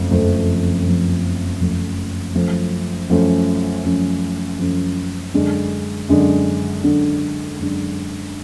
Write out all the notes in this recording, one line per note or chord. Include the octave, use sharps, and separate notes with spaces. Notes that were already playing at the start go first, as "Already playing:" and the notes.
Already playing: F#1 F2 F3 A3
F#1 F2 F3 A3
F#1 F2 F3 A3
F#1 F2 F3 A3
F#2 F3 A3 C#4
F#2 F3 A3 C#4
F#2 F3 A3 C#4
F#2 F3 A3 C#4
F#2 D3 G#3 D4
F#2 D3 G#3 D4
F#2 D3 G#3 D4
F#2 D3 G#3 D4